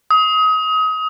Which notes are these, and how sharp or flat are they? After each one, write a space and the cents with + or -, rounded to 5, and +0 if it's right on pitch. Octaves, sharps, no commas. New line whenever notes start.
D#6 +30